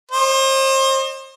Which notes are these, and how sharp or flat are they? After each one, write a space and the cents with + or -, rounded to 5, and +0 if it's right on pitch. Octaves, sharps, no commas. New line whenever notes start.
C5 +35 D#5 -30